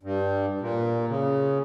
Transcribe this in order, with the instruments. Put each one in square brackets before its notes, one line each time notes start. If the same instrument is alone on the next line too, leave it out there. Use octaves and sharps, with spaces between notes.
[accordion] G2
A#2
C#3